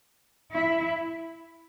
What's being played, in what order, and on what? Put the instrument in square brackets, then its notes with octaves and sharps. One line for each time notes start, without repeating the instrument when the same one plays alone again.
[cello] E4